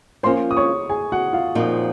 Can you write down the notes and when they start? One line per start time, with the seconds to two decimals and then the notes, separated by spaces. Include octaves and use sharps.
0.23 F3 A#3 C#4 F4 C5 C6
0.51 D#6
0.57 C#5 C#6
0.90 G#4 G#5
1.12 F#4 F#5
1.33 F4 F5
1.55 A#2 F3 C4 D#4